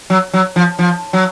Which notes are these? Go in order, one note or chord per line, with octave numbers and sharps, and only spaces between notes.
F#3
F#3
F3
F3
F#3